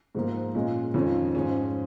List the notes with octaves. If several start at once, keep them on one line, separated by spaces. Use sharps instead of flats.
G#2 F3 A#3
A#2 G#3 C#4 F4
F2 D#3 C#4 F4
G#2 F3 C#4